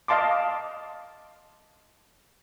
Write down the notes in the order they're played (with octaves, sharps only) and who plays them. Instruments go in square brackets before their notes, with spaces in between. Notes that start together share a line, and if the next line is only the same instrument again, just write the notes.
[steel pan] D#5 F5 A5 C6 D6